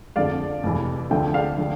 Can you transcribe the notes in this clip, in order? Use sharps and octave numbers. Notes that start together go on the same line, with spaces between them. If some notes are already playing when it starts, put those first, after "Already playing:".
F2 D3 F3 D5 F5
F2 C3 E3
D2 D3 F3 E5 G5
D5 F5
D3 F3